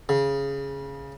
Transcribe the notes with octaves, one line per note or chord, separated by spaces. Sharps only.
C#3